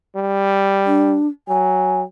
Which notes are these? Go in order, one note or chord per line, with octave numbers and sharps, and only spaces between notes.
G3
D4
F#3 G#5